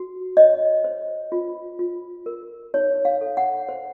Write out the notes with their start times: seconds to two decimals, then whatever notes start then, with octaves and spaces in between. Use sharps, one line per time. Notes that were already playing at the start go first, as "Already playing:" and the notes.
Already playing: F#4
0.37 C#5 D#5
0.84 C5
1.32 F4
1.79 F4
2.26 A#4
2.74 D#4 C#5
3.05 F5
3.21 A4
3.37 F#5
3.69 C5